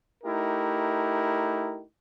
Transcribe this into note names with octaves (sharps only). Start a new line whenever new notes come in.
A3 D#4 E4 G4 A#4